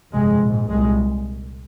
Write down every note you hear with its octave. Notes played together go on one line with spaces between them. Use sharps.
G1 F2 C3 G#3
A#1 G#2
C2 A#2 G#3